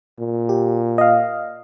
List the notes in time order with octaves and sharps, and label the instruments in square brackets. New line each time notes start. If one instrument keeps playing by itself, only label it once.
[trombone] A#2
[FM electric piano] G4
D#5 F5